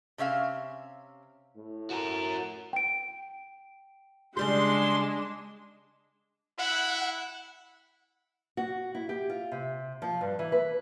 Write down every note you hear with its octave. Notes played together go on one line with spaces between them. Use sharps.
C3 C#4 E5 F5
A2
F#4 A#4
G5 D7
C#3 G3 G#3 D4 G4 C6
E4 F#5
F#4
E4
G4
F4
C3
F3
G2
E3
B4